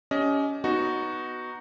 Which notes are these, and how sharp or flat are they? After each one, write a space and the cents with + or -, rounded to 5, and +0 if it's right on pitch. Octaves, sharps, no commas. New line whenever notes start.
C#4 +25 G4 +0 D#5 +10
B3 +0 D#4 +0 F#4 +0